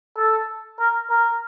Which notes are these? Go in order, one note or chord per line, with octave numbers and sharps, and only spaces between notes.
A4
A#4
A#4